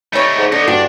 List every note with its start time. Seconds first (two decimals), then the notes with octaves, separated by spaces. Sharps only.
0.13 G3 A3 D#4 C#5
0.37 G#2
0.52 D3 B3 D#4 A4
0.68 G2 D4 F#4